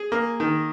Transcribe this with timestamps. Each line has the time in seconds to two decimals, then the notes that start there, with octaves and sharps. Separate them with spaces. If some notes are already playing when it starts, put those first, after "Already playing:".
Already playing: G#4
0.12 A#3
0.40 D#3